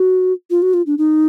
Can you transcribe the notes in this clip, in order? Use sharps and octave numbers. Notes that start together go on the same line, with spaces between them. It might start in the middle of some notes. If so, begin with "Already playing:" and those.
Already playing: F#4
F4
F#4
F4
D4
D#4